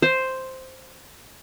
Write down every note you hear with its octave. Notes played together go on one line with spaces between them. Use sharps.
C5